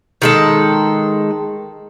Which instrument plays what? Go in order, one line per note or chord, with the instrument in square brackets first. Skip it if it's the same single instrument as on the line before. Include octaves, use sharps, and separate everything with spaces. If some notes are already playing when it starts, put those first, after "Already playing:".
[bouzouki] D#3 G#3 A4